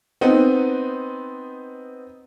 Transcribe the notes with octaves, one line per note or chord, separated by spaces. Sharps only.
B3 C4 D#4